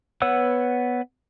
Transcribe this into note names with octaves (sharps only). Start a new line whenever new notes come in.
B3 B4 C#5 F#5 E6